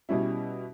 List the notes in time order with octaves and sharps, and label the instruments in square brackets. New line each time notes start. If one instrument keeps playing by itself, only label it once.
[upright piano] B2 G3 C#4 E4